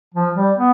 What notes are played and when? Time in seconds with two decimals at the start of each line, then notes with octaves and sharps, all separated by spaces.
0.14 F3
0.35 G3
0.57 B3